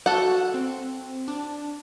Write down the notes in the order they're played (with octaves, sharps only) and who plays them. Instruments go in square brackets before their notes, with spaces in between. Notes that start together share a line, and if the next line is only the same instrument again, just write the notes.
[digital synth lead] F#4 [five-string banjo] A4 F#5
[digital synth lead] C4
D4